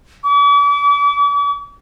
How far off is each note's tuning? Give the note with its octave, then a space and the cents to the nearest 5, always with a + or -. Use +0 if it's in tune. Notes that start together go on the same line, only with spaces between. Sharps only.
D6 -40